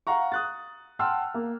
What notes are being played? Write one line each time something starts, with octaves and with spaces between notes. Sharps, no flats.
F5 F#5 A#5 C#6
D#6 F#6 A6
F#5 G5 A5 C6 E6 F6
A#3